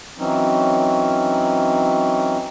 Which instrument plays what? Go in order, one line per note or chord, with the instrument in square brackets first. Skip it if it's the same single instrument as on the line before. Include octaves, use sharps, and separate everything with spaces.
[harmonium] E3 F#3 C4 C#4 D#4